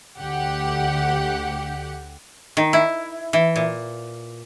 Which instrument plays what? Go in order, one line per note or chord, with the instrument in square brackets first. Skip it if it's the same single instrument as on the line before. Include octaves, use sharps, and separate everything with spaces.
[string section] D2 G4 F#5
[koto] D#3
E4
E3
A#2